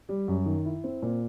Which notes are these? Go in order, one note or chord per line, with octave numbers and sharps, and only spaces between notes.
G3
F#2
D#3
E4
C4
A#2